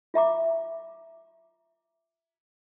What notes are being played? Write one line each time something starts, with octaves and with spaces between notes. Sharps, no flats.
F4 E5 A#5 D6